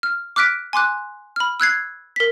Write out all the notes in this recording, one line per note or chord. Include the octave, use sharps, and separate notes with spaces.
F6
D6 F6 F#6 B6 D7
G#5 C6 D6 F#6
B5 F6
E6 F#6 G#6 C7
A#4 B6